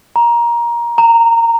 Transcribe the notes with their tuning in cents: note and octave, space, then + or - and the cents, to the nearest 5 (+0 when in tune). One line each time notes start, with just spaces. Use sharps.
A#5 +15
A#5 -15